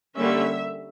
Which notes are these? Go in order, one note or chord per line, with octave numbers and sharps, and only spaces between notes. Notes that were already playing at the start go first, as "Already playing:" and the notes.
D3 G3 A#3 C#4 E5